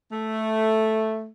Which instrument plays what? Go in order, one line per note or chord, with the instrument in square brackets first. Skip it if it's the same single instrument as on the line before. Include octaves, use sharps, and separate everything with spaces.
[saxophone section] A3